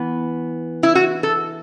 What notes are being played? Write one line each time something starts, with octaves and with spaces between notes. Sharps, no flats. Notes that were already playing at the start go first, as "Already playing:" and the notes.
Already playing: E3 B3
E4
F#4
A4